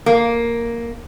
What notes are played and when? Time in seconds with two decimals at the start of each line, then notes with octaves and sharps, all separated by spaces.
0.06 A#3